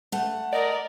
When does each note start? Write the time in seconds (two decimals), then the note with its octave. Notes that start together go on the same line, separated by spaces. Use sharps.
0.12 A3 F#5
0.53 A#4 D5 D#5